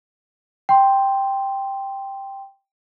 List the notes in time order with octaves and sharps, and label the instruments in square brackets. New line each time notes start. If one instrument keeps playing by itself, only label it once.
[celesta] G5 C6